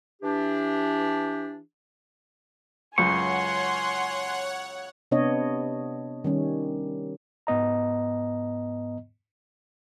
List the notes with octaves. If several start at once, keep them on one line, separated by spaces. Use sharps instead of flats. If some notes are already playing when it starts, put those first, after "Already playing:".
E3 D4 G4
C#2 F#2 C#5 F#5 G#5 C6 C#6
C3 B3 D4 C#5 D#5
D#3 G3 C#4
G#2 B3 D#5 A#5